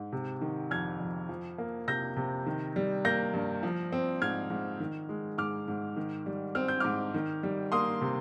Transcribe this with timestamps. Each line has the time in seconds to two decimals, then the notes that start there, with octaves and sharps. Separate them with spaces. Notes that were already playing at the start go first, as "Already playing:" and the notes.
Already playing: G#2
0.12 C3
0.41 D#3
0.71 F2 F6 G#6
1.00 F2
1.29 F3
1.58 A#3
1.88 C3 G6 A#6
2.16 C3
2.46 D#3
2.76 G3
3.05 A#3 G6 A#6
3.34 G2
3.63 F3
3.92 C4
4.22 G#2 F6 G#6
4.50 G#2
4.80 D#3
5.09 G#3
5.38 G#2 D6 F6
5.68 G#2
5.97 D#3
6.26 G3
6.55 C4 F6
6.68 G6
6.80 G#2 D6 F6
7.14 D#3
7.43 G3
7.72 A#3 C6 D#6
8.01 C3